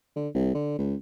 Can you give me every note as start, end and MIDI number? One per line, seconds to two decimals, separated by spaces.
0.16 0.29 50
0.34 0.54 36
0.55 0.76 50
0.79 0.95 37